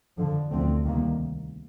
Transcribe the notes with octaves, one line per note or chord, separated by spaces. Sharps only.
F2 D3 F3
D2 D3 F3 A3 C4
C2 C3 D#3 A#3